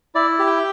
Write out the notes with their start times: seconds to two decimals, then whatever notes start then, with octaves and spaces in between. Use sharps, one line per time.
0.15 E4 D5
0.39 G4
0.47 G5